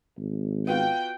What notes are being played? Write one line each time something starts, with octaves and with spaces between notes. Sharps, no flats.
G#1
B3 F4 F#4 G5